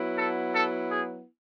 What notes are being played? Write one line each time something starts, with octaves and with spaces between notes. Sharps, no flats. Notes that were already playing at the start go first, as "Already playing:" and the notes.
Already playing: F#3 B3 E4
A4
A4
G#4